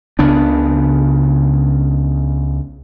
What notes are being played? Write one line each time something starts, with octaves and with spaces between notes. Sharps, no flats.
C#2 C#3 B3 D4